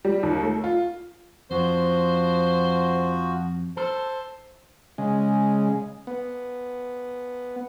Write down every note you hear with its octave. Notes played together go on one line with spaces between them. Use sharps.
G3
D#2
A3
F4
F2 F3 F#4 C5
A4 C5 A5
C#3 G#3
B3